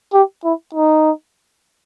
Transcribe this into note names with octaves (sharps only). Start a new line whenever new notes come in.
G4
E4
D#4